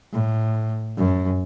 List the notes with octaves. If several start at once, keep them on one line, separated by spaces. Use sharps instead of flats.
A2
F#2